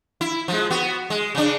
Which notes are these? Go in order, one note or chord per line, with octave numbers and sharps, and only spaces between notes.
E4
F3 G#3
B3 F#4
G#3
C#3 D4